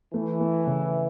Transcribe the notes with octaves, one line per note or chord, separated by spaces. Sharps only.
E3 A3
A3
C#3